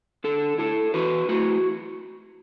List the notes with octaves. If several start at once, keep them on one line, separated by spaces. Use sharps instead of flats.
D3 A4
A3 E4 A4
E3 F#4 B4
A3 E4 F#4